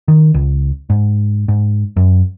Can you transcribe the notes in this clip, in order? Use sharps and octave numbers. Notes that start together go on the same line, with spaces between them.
D#3
C#2
G#2
G#2
F#2